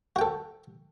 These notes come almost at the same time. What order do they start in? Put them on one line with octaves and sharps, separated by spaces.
F#4 G5 A4